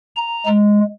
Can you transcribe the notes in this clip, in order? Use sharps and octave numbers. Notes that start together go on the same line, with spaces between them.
A#5
G#3